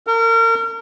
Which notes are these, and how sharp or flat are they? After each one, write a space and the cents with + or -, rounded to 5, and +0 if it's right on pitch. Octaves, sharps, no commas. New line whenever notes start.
A#4 -35